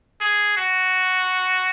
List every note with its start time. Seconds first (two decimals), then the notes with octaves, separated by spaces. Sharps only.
0.21 G#4
0.57 F#4